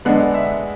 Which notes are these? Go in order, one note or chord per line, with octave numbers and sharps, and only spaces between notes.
D3 G#3 B3 D4 F#5
E5